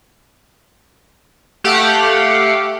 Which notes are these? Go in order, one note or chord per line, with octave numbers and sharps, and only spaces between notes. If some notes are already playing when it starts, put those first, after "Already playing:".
A3 G4 F5 F#5